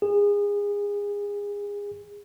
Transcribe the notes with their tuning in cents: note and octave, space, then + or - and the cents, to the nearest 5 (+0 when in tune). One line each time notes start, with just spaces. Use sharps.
G#4 -30